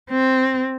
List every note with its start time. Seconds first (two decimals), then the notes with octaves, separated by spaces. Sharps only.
0.10 C4